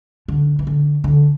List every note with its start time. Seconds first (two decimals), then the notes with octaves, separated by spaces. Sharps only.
0.28 D3
0.59 E3
0.67 D3
1.04 D3